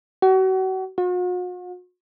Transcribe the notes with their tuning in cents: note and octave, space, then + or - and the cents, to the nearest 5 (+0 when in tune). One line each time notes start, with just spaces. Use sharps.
F#4 +35
F#4 -45